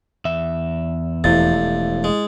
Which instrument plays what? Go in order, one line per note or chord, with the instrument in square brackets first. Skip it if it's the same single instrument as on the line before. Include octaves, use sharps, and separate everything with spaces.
[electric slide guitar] E2 E5
[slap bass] E1 A3 [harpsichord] F2 C3 [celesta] E4 A6
[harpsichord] G#3